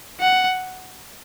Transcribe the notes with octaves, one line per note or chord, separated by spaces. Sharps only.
F#5